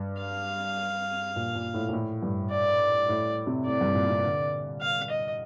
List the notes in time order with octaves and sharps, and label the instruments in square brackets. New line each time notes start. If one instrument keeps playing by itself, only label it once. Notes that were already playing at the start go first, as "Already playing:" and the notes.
Already playing: [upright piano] G2
[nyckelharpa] F5
[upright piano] A#2
A#2
A2
A#2
A2
G2
[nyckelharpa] D5
[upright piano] A2
C3
[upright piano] A2 [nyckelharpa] D5
[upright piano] G2
A#2
C3
D3
[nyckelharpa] F5
D#5